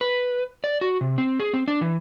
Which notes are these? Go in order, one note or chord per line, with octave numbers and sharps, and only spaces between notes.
B4
D5
F#4
C3
C4
G#4
C4
D4
E3